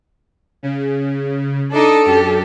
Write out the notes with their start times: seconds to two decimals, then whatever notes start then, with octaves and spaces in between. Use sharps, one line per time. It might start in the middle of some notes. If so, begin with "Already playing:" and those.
0.63 C#3
1.72 D4 D#4 A4 D6 D#6
2.06 F#2 G4